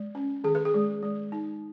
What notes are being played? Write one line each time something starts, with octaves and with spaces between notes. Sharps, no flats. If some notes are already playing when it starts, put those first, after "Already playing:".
Already playing: G#3
C#4
D#3 G#4
B4
G#4
G#3
G#3
D#4